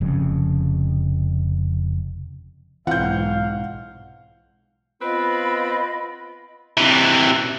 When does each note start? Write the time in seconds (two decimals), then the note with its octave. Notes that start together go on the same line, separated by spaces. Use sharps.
0.01 F1 F2 C#3
2.87 B1 G#2 E3 C4 F4 F5 F#5 G6
5.02 B3 C4 F4 B4 D#5 B5
6.77 C3 E3